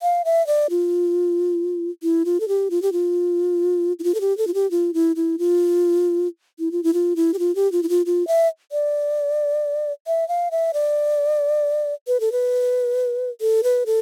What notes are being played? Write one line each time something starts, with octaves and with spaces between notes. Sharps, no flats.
F5
E5
D5
F4
E4
F4
A4
G4
F4
G4
F4
E4
F4
A4
G4
A4
F4
G4
F4
E4
E4
F4
E4
F4
E4
F4
E4
G4
F4
G4
F4
E4
F4
F4
E5
D5
E5
F5
E5
D5
B4
A4
B4
A4
B4
A4